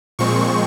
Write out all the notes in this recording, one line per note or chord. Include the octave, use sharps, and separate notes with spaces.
A#2 F3 G#3 C4 C#6